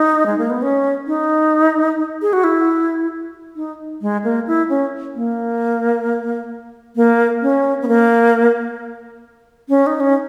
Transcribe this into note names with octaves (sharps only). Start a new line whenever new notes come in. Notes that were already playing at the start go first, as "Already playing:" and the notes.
Already playing: D#4
G#3
A#3
B3
C#4
D#4
G#4
F#4
E4
D#4
G#3
A#3
E4
C#4
A#3
A#3
C#4
B3
A#3
C#4
D#4
C#4